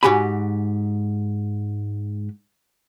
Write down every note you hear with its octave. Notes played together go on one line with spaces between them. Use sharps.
G#2 F#4 G4 G#5 B5